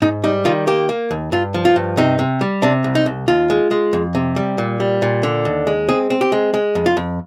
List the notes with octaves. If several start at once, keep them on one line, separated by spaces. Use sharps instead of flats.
G#2 D#4
G3 D#4
D#3 F4
A#3 G4
A#3
D#2
G2 F4
F3
F4
G2
C3 D#4
C3
G3
C3 D4
C2
D#4
C2
D#2 F4
G#3
G#3
F2
C3
G3
A#2
G3
A#2
D3
D#2
G#3
C4 G#4
C4
G4
G#3
G#3
F2
F4
F2